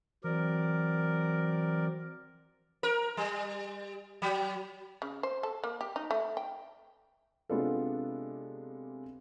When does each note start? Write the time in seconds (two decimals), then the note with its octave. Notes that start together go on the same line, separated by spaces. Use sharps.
0.24 E3 F#3 C4 A#4 D5
2.83 A#4
3.17 G3
4.22 F#3
5.02 C#3
5.23 C5
5.43 A4
5.64 A#3
5.81 G4
5.96 D#4
6.11 A3
6.37 G5
7.49 C3 G#3 B3 D4 F4 A4